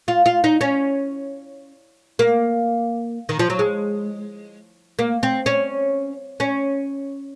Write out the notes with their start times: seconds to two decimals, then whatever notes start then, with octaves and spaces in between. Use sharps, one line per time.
0.08 F4
0.26 F4
0.44 D#4
0.61 C#4
2.19 A#3
3.29 D#3
3.39 F3
3.50 F#3
3.59 G#3
4.99 A#3
5.23 C4
5.46 C#4
6.40 C#4